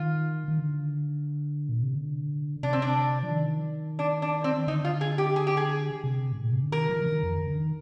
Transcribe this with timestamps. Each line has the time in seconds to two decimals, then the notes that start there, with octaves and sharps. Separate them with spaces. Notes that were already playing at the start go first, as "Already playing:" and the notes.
Already playing: D#3 F4
0.48 D#3
0.58 D3
1.69 A#2
1.81 C3
1.95 D3
2.63 C3 D4
2.73 C4
2.82 D4
3.23 F3
3.30 D#3
3.99 D4
4.22 D4
4.44 C4
4.67 D3 D#4
4.85 F4
5.01 G#4
5.18 G4
5.36 G#4
5.47 G4
5.57 G#4
6.04 C3
6.32 G#2
6.43 A#2
6.53 C3
6.63 D3
6.72 D#3 A#4
6.90 F3
7.01 D3
7.06 D#3
7.23 F2
7.47 D3
7.57 D#3